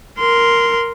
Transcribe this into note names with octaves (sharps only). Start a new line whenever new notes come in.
A#4 C6